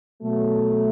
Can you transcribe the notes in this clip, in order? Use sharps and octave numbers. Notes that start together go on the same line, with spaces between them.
B2 F#3 A3